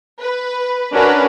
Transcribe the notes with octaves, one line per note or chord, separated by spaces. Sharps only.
B4
C#4 D4 F#4 A#4 B4